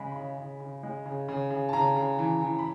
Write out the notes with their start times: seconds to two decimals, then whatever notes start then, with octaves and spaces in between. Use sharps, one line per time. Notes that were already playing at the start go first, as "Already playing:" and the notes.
Already playing: C#3 G#3 B5
0.11 C#3 B5
0.38 C#3
0.60 C#3
0.83 G#3
1.06 C#3
1.28 C#3
1.51 C#3
1.69 A5
1.73 C#3 A#5
1.96 C#3
2.18 E3
2.41 E3
2.59 B5